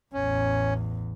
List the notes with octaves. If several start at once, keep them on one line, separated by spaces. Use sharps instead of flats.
A1 E2 C#4